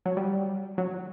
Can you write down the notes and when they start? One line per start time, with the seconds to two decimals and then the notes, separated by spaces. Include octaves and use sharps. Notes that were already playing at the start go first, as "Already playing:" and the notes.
0.06 F#3
0.17 G3
0.78 F#3